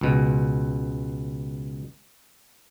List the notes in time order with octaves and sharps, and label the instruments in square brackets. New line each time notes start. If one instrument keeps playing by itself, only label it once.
[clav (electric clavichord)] C#2 B2